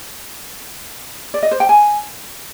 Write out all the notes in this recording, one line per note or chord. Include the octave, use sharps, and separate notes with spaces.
D5
D#5
C5
G5
G#5